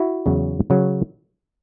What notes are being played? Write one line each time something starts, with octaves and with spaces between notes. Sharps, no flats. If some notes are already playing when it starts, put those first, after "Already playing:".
Already playing: E4 F#4
E2 C#3 F#3
C#3 F#3